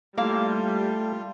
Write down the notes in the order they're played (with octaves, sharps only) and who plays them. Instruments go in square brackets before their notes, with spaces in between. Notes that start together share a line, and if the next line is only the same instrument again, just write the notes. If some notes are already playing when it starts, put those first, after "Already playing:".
[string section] G3 [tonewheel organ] A3 [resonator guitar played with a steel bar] A#3 E4 F5 [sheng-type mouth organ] F4